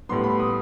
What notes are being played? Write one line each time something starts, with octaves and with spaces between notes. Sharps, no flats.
A2 G3 B3 C6
B5
D#6